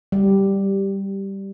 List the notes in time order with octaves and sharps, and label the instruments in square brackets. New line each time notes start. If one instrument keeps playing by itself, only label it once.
[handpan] G3